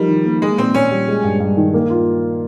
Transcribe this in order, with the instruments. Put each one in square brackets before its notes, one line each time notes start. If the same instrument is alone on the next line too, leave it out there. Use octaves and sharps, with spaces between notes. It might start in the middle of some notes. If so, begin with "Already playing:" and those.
Already playing: [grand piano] F3 D#4 A#4 [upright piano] G3
[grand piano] D#3
A#3
[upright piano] G#3 [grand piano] A#3
[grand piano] A#2 [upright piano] C4
[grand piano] A#2 [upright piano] C#4
[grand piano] G3
G#3
G2
G2
D#3
A#3
F4